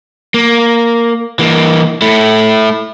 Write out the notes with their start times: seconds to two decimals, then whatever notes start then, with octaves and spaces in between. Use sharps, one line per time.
0.34 A#3
1.39 E3 A#3
2.02 A3 E4